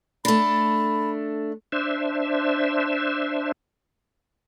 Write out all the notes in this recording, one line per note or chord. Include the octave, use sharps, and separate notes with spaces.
A3 D4 B5
D4 C5 E5